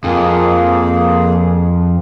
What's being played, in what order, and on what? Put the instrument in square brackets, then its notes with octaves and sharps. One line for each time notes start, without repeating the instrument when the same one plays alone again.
[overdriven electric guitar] F2 [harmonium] A#3 G#4